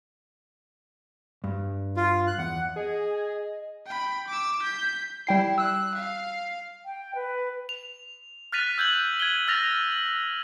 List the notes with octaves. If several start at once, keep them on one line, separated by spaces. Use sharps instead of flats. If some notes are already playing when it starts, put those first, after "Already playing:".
G2
F4
F#6
E2 F#5
G#4 D#5
G5 B5
D6 E6
G6 B6
G3 E4 G5 C7
E6 F#6
F5
G5
B4
F7
F6 F#6 A6 B6 D#7 F7
E6 G6 G#6 F#7
G#6 D#7 G7
E6 F6 A6 A#6 F7
F#7